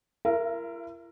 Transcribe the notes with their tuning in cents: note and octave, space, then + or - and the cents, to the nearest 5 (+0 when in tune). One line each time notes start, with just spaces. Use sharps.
E4 +45 A#4 +0 E5 +30